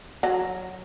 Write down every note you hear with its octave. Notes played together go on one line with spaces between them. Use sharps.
F#3